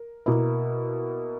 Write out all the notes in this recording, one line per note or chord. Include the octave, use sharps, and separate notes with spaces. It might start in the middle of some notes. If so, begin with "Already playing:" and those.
Already playing: A#4
B2 A#3 E4